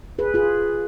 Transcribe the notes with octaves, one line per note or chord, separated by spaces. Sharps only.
G#4 B4
F4 G#4